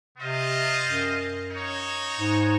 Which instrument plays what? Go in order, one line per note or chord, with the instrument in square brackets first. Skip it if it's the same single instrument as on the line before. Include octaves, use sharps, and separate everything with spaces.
[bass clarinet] C3 [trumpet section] C4 F4 C5 D#5
[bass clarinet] F#2
[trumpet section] D#4 F#4 C#5
[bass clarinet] G#2